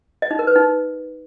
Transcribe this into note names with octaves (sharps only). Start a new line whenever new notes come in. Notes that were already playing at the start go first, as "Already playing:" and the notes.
D#5
D#4
A#4
B4
D#4